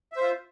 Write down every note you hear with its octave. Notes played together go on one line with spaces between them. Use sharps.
F4 C5 E5